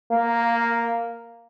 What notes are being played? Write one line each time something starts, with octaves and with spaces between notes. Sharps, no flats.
A#3